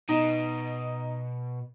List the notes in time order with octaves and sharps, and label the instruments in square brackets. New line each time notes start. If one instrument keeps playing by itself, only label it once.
[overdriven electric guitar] B2 [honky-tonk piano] D#4